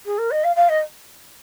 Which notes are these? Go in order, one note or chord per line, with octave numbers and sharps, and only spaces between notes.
G#4
A#4
D#5
F5
F5
D#5